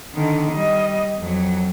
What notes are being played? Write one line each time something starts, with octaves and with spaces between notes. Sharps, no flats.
D3 D#3
G3 D#5
F2 F#3